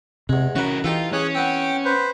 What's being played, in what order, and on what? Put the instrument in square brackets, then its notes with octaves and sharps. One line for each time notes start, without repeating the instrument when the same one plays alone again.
[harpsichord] E2 G#3 [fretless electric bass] C3
[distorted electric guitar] E3 A#4 [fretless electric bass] C#4 [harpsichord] F#4 B4
[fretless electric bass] E3 [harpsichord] D#4 G4 A4 [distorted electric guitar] F4
[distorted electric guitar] C#4 [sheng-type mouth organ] G#4 C#5 F#6
[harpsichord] B3 C4 [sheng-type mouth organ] G5
[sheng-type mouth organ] B4 C5